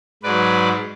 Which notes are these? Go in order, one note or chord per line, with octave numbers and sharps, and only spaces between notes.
G#2 F#3 B4 D5